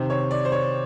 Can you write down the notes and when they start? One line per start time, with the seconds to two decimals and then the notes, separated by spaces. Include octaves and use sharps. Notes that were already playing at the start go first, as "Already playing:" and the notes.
Already playing: C3 D#3 C5
0.10 C#5
0.31 D5
0.45 C5
0.52 C#5